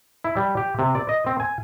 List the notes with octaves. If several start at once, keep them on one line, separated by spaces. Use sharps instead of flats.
E4
G3
G4
C3
D5
D#5
C4
G#5